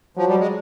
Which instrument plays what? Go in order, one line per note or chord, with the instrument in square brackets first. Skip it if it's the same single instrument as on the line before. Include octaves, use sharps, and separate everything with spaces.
[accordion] F3 [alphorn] F#3
[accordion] G3
G#3